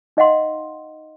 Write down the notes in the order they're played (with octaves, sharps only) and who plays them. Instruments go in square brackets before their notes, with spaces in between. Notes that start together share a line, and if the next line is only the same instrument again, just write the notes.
[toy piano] D#4 D#5 F5 F#5 C6